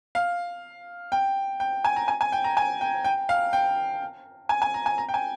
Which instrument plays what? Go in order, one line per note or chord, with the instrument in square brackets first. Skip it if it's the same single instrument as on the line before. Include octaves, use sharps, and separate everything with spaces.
[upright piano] F5
G5
G5
G#5
A#5
G#5
G#5
G5
A#5
G#5
G5
G5
F5
G5
G#5
G#5
A#5
G#5
A#5
G5
G#5